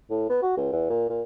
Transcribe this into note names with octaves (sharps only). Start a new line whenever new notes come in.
A2
B3
F#4
C#2
E2
A#2
A#2